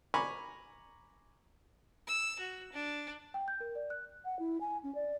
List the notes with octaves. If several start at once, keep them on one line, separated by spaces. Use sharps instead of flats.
G#5 A#5 B5 C#6 D6
E6
F#4
D4
G5
G6
A#4
D5
F#6
F#5
E4
G#5
C#4
D5